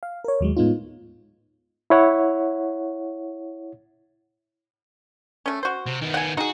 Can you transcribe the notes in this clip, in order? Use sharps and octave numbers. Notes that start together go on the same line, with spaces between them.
F5
A#4 C#5
D#2 F#3 G#3
A2 G#3 B3 D#4 F4
E4 C#5 F#5
A3 C#4
F#4 C5
C3
D#3 B3
F#5 G#5
D#4 F#4 G#4